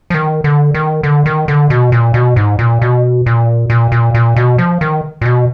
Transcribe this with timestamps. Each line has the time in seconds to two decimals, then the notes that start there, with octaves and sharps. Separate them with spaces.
0.10 F3
0.14 D#3
0.44 D3
0.74 D#3
1.03 D3
1.26 D#3
1.48 D3
1.70 B2
1.92 A#2
2.14 B2
2.36 G#2
2.59 A#2
2.82 B2
3.26 A#2
3.70 A#2
3.92 A#2
4.14 A#2
4.36 B2
4.58 F3
4.81 D#3
5.21 A#2
5.25 B2